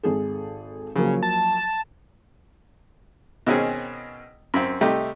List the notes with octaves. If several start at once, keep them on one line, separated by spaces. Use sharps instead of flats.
G#1 G#4 A4
C#3 F3 F#3 A#3
A5
B2 D#3 C4 C#4 G#4
F#2 C4
C3 G3 A3 D#4 G4